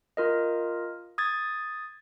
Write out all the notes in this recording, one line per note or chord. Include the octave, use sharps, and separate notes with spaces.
F4 A#4 D#5
D#6 G#6 A6